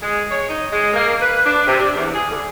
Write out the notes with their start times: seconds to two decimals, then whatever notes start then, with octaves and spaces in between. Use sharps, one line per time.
0.02 G#3
0.31 C#5
0.49 D#4
0.73 G#3
0.93 A#3
1.21 B4
1.46 D4
1.67 C3
1.80 D4
1.96 E2
2.14 G#4
2.31 D3